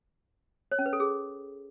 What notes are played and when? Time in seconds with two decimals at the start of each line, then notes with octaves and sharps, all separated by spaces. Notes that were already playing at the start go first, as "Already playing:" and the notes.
0.72 C#5
0.79 C#4
0.86 B4
0.93 A4
1.00 G#4